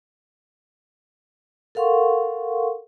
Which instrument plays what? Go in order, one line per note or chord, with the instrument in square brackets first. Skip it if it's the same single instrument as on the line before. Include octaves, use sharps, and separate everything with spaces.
[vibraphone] A4 A#4 F5 F#5 C6 C#6